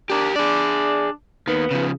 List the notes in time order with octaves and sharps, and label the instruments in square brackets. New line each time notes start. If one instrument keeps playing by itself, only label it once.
[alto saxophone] D4 [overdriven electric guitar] G4 A#4
[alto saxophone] D4 [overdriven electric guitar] G#4 D5
[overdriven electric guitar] D#2 D#3 [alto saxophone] B3
[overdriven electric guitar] C#3 F3